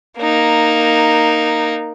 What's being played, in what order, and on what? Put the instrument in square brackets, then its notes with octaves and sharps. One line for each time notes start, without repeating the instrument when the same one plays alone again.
[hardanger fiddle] A#3 D#4